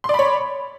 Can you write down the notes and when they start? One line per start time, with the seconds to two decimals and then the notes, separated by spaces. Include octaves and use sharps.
0.04 C6
0.09 D5
0.14 B5
0.19 C#5